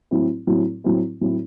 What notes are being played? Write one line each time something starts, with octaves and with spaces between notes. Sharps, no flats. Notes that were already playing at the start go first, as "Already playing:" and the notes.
A2 F#3 C4 E4
A2 F#3 C4 E4
A2 F#3 C4 E4
A2 F#3 C4 E4